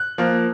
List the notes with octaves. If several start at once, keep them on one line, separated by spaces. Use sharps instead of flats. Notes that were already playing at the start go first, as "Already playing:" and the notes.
Already playing: F#6
F3 A#3